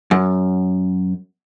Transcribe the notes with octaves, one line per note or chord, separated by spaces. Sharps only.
F#2